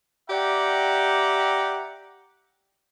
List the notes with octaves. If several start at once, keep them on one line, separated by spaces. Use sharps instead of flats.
G4 D5 E5 F#5 G5 A#5